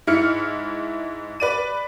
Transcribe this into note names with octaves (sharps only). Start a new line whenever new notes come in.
G#2 E4 F6 C#7
B4 D5 D#7